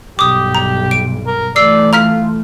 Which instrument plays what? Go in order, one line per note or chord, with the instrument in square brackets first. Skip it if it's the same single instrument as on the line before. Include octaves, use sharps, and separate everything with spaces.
[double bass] B1 G2 [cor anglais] G4 [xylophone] D6 D#6
[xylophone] A#5
D7
[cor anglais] A#4
[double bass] E3 A3 [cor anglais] D5 [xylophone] E6 C7
[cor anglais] F4 [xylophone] A#5 F6 B6